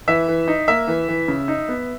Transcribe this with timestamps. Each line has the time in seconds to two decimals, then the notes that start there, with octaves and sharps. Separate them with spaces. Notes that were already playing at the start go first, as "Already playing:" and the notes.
0.08 E3 E5
0.28 E3
0.48 D#4
0.68 A#3 E5
0.87 E3
1.08 E3
1.28 C#3
1.48 D#4
1.69 B3